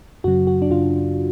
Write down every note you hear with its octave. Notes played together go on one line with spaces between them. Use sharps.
F#2 C#3 F#3 F#4
F#4
D4
F#2 C#3 F#3 F4